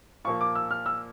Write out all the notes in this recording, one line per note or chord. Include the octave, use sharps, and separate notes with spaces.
A#2 F3 A#3 C#6
D6
E6
F6
E6